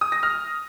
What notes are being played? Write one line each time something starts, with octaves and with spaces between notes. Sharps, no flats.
D#6
A#6
F6